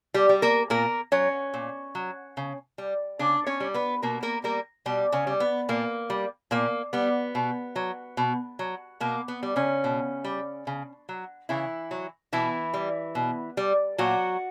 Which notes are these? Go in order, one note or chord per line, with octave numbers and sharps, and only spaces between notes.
G3 G4
G3
A#3 A#4
A#2 A#3 A#4
F#3 C#4 C#5
A#2
F#3
C#3
G3
C#3 D4 D5
C#4 C#5
G3
B3 B4
B2 A#3 A#4
A#3 A#4
G3 A#3 A#4
B2 G3 G4
C#3 C#4
G3
B3
A#2 A#3
G3
A#2 A#3
G3 B3
B2
F#3
B2
F#3
B2 A#3
B3
G3
C#3 C#4
B2
G3
C#3
F#3
C#3 E3 E4
F#3
B2 E3 E4
G3
B2
G3
A#2 F#3 F#4